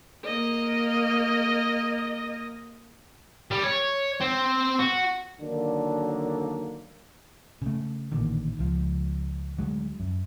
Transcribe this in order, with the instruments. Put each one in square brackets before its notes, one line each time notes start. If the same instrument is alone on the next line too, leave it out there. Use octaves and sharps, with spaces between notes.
[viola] A#3 D#5
[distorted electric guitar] G3
C#5
C4
F#4
[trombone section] D3 D#3 F#3 A#3 D4
[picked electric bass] C#3 A3
A1 A#2 D3 D#3
C#2 F3
D2 F#3 G#3
F#2